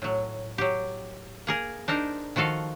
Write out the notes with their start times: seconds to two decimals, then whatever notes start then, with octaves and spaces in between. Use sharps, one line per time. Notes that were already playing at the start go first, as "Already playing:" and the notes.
0.02 A2 F#3
0.58 F#3 G4
1.47 A#3 G#4 A#4
1.88 D4 D#4 A#4 C5
2.36 D#3 F3 F#4 A4 F5